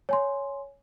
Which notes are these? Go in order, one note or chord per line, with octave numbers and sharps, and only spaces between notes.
C#5 G#5 C6